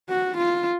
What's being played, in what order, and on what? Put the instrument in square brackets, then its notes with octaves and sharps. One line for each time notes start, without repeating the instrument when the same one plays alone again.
[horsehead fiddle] F#4
F4